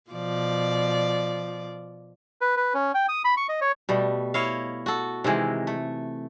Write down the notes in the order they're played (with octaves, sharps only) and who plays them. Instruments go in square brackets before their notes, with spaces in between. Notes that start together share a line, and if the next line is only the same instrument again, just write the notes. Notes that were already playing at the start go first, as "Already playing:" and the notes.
[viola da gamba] B2 F3 D5
[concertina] B4
B4
C#4
G5
D#6
B5
C#6
D#5
C#5
[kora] B2 G3 A3
E4 C#5 D#5 F5
F#4 A4
C3 D#3 E3 G#3
A3